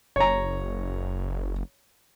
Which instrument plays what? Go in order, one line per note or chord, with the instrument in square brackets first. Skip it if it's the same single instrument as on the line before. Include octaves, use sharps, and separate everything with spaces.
[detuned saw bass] F#1 [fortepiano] C#5 A#5